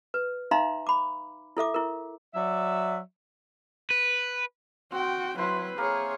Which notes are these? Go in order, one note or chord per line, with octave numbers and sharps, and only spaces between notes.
B4
D#4 E5 F5 A#5 C6
B5 D6
E4 A4 E5 D6
E4 A#4
F#3 D5 E5
B4
C4 F#4 G5
F#3 E4 B4 C5
A#3 G#4 A#4 C#5